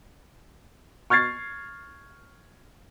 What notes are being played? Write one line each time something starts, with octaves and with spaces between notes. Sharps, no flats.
C#6 F6 G#6 A6 C7